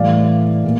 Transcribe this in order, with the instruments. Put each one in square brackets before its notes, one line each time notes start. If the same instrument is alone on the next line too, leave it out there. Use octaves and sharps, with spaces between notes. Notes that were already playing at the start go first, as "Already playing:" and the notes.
Already playing: [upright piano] A2 E3 G3 D5 F5
A#2